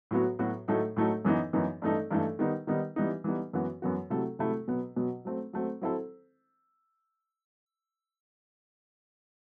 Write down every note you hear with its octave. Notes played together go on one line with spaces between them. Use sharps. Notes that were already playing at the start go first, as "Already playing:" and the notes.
A2 F#3 B3 F#4
A2 F#3 B3 F#4
A2 F#3 A3 D#4 A4
A2 F#3 A3 D#4 A4
F#2 E3 B3 D#4
F#2 E3 B3 D#4
G2 E3 A3 D#4 A4
G2 E3 A3 D#4 A4
D#3 G3 B3 D#4
D#3 G3 B3 D#4
E3 G3 B3 D#4
E3 G3 B3 D#4
F#2 E3 B3 F#4
F#2 E3 B3 F#4
C3 F#3 A3 E4 A4
C3 F#3 A3 E4 A4
B2 F#3 B3
B2 F#3 B3
F#3 A3 C4
F#3 A3 C4
F#3 C4 E4 A4 C5